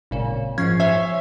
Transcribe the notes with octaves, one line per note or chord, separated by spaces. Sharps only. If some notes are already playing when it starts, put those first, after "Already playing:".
G#1 A#2 C#3
G#2 F3 C#4 C#6 G#6 C7
C5 C#5 E5 G#5